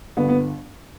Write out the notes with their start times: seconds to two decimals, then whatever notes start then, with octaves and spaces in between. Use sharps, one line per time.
0.17 G1 B3
0.29 B3